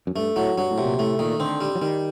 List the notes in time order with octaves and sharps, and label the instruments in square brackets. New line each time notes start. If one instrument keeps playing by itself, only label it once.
[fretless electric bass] F#2
[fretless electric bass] G2 [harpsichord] A3
[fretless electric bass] A2 [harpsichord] F#3
[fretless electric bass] G2 [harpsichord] F#3
[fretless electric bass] A2
[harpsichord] C3
[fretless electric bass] A#2
[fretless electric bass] A2 [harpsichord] A3
[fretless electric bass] A#2 [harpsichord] D#3
[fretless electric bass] D3 [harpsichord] C4
[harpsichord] G3
[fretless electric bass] F#3
[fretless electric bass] D#3 [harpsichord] G3